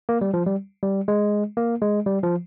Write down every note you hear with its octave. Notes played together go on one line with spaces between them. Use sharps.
A#3
G3
F3
G3
G3
G#3
A#3
G#3
G3
F3